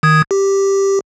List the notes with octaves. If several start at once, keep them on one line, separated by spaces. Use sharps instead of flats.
D#3 D#6 G#6
G4